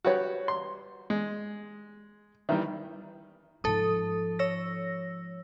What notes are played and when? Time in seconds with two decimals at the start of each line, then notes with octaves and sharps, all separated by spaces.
0.05 G3 F#4 G4 B4 C#5
0.48 C6
1.10 G#3
2.49 D#3 E3 G3 E5
3.64 G#2 F3 A4 D#6
4.39 C#5 E6 A#6